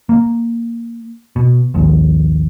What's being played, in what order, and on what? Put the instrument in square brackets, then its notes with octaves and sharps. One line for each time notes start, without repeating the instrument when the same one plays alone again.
[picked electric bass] A#3
B2
A#1 D#2 G#2